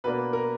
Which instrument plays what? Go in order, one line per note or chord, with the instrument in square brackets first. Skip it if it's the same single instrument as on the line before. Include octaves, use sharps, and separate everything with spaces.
[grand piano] B2 A#3 D4 B4
A#4